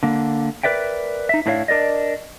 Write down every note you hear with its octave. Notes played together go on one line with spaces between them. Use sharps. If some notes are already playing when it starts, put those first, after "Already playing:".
D3 A#3
A#4 B4 D5 E5 G5
D#4 E5
A2 D4 E4 C#5 D5 F5
D4 A#4 D5 D#5